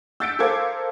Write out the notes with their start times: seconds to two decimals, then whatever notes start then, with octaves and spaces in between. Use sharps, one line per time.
0.20 E6 G6 A6 B6 C#7 D7
0.39 A4 A#4 C5 F5 D6 G#6